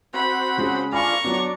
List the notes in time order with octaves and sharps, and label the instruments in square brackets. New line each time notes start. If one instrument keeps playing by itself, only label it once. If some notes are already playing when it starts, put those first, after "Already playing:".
[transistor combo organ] C4 F#4 [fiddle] B5
[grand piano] C#3 G#3
[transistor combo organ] D4 F4 [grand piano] G#5 B5 [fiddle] A#5 C#6
[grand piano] F#3 B3 [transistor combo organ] D4